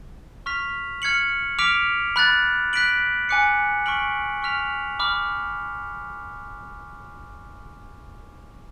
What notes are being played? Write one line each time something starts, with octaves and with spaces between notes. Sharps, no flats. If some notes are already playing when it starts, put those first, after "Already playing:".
C#6 F6 B6 F7
F6 G#6 C#7 F#7
D6 F6 B6 D7 F7
B5 F#6 A6
F#6 B6 D7 F#7
G#5 D6 F#6 C#7
C#6 F6 B6 D7 F#7
C#6 F6 B6 F7
B5 D6 F6